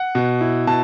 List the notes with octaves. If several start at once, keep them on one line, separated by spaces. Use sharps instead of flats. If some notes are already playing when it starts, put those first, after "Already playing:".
Already playing: F#5
B2
E4
B2 A5